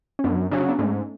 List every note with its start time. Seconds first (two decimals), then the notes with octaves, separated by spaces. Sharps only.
0.19 C#4
0.24 F#2 B3 D4
0.51 C#3 F#3 D4
0.60 C#4
0.69 B3 D4
0.79 G#2 A3 C#4